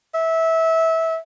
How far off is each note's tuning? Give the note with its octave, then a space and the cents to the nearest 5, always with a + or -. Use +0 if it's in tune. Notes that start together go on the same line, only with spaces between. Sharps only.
E5 -20